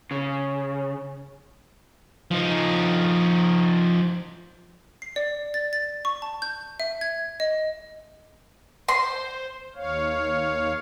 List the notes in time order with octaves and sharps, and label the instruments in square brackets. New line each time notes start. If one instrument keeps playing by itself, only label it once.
[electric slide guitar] C#3
[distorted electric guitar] F3 D#4
[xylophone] C7
D5
A6
A6
C#6
A5
G6
E5
G#6
D#5
[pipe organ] C5 [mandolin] C6
[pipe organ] D#2 C#5 F5